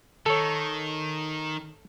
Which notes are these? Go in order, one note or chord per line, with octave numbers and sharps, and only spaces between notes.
D#3 A4 C#5